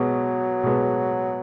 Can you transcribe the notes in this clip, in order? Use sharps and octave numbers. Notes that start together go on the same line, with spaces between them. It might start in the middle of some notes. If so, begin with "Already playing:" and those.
Already playing: B2 F#3 G#3 B3
B2 G#3 B3